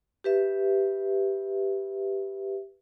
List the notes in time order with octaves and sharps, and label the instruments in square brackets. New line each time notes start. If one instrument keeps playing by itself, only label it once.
[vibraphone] G4 B4 E5